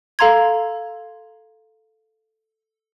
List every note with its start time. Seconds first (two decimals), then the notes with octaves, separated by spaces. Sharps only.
0.19 A4 F5 A#5 C6 G#6